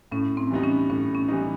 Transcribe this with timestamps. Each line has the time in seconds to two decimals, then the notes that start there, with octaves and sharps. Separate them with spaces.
0.12 A2 C#4
0.37 C4
0.50 E3 G3 B3 D#4
0.63 C#4
0.90 A2 C#4
1.15 C#4
1.28 E3 G3 B3 D#4